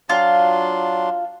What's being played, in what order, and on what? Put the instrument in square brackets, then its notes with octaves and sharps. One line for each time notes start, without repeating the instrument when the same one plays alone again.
[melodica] F#3 D4 C6 [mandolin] F4